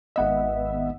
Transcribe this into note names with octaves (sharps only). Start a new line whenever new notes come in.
G#1 B3 D#5 E5 F#5